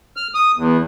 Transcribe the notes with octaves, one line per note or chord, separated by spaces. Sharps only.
F6
D#6
E2